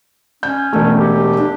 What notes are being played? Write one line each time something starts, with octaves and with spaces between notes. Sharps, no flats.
C#4 G6
E1 A3
G4
D4